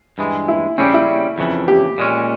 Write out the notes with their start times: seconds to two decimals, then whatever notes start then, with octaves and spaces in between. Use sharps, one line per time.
0.18 G2 E3 G#3
0.48 E4
0.78 C#3 G3 C4 C#4
0.94 E4
1.38 F2 C#3 E3
1.68 G4
1.98 A#2 G#3 C#4